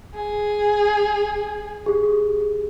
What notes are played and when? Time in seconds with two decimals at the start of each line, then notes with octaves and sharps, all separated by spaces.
0.15 G#4
1.86 G4 G#4